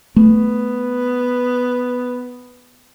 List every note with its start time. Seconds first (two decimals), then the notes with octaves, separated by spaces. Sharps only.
0.16 A3 B3